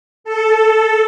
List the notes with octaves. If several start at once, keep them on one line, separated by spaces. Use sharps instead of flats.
A4